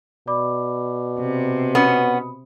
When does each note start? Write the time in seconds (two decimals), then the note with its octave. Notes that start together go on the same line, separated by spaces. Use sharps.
0.27 B2 D5 B5 D6
1.20 C3
1.75 B3 C#4 B5 D#6